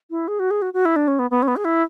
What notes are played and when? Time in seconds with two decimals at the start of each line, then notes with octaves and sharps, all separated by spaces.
0.10 E4
0.28 G#4
0.39 F#4
0.51 G#4
0.62 F#4
0.74 F#4
0.85 E4
0.96 D4
1.08 C#4
1.19 B3
1.30 B3
1.42 C#4
1.48 B3
1.56 G#4
1.65 E4